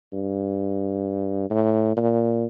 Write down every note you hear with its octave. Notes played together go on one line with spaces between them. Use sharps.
G2
A2
A#2